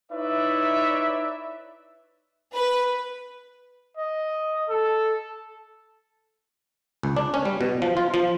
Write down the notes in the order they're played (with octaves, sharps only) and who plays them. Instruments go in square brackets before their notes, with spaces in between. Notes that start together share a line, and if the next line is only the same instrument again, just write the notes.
[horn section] D#4 E4 B4 C#5 D5 E5
[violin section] B4
[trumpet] D#5
A4
[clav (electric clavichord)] C#2
D4
C#4
G3
B2
F3
F4
F3